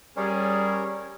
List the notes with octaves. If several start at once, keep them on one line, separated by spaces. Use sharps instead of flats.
G3 C#4 G#4 A#4 C#5